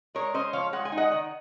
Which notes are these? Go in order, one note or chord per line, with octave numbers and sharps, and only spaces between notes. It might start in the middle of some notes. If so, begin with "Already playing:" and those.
G#3 A#4 C#5
C#4 C5 D#5
F3 C#5 F5
G#3 F#5
G#5
D#4
D#5 F#5
D#3